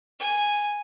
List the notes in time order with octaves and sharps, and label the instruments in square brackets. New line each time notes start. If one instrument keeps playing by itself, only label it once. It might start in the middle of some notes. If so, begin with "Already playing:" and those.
[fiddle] G#5